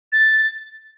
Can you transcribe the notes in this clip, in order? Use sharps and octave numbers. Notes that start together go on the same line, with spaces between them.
A6